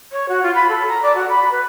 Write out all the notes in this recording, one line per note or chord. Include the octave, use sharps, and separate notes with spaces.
C#5
F#4
F4
B5
A4
A#5
D5
F#4
B5
B4